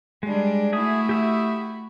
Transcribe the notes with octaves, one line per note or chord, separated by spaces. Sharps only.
G3 G#3 D4
A3 E4 F#4 G#4 E5 D#6
G4 E5 D#6